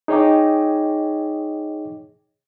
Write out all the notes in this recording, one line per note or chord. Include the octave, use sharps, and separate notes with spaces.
D#4 G#4 C#5 D#5 G5 D6